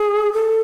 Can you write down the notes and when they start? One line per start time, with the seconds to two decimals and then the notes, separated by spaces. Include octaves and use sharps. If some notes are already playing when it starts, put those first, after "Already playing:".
Already playing: G#4
0.33 A4